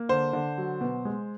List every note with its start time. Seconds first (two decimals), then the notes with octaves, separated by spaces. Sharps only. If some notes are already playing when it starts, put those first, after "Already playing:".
Already playing: A#3
0.09 D3 C5
0.33 D3
0.58 F#3
0.81 B2
1.05 G#3